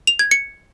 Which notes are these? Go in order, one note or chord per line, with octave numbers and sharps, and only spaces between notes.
F7
G#6
C#7